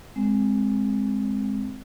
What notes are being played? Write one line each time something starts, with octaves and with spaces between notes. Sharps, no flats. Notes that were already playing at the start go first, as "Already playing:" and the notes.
G#3 C4